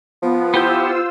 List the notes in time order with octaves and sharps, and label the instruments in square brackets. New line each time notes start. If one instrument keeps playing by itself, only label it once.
[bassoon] F3 [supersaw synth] B3
[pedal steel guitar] B3 G4 G6 [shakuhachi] E4 [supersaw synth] F4 C5 E6